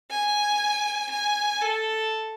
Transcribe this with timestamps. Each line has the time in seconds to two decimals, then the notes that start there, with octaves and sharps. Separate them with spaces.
0.11 G#5
1.11 G#5
1.61 A4